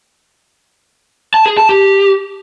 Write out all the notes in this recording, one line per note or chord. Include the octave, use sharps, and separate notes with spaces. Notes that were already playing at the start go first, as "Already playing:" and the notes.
A5
G#4
A5
G4